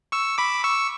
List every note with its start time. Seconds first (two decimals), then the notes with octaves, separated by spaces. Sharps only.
0.12 C#6 E6
0.38 B5 D6
0.64 C#6 E6